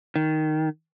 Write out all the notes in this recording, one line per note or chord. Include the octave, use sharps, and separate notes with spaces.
D#3